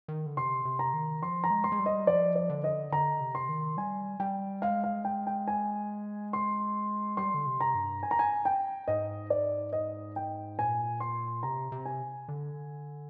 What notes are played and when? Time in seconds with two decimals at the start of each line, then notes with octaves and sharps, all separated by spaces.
0.08 D#3
0.26 D3
0.37 C3 C6
0.65 C3
0.79 A#5
0.93 D#3
1.22 F3 C6
1.44 A#5
1.50 G#3
1.64 C6
1.72 G#3
1.79 G3
1.86 D#5
2.07 F3 D5
2.36 D5
2.50 D3
2.64 D#5
2.92 D3 A#5
3.21 C3
3.35 C6
3.49 D#3
3.77 G3 G#5
4.20 G3 G5
4.62 G#3 F5
4.84 F5
5.05 G5
5.27 G5
5.48 G#5
6.33 C6
7.17 G3 C6
7.34 D3
7.46 C3
7.61 A#5
7.75 G2
8.03 G#5
8.11 A#5
8.19 G#5
8.45 G5
8.88 G#2 D#5
9.30 D5
9.73 D#5
10.16 G5
10.58 A#2 G#5
11.00 C6
11.43 C3 A#5
11.72 C3
11.85 G#5
12.28 D3